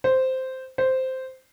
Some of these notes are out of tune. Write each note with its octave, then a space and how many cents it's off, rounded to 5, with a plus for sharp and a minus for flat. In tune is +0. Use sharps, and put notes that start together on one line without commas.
C5 -5
C5 -5